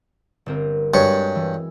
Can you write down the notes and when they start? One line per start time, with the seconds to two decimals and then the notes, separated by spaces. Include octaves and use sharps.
0.46 G1 C4 A#4
0.94 G2 G#3 F#4 C#5
1.35 E3